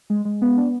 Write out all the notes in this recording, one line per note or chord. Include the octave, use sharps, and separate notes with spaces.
G#3
G#3
B3
D4